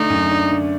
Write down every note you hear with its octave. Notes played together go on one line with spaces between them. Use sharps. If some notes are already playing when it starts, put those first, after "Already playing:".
Already playing: D3 A3 D4 D#4
F#2
D4
D3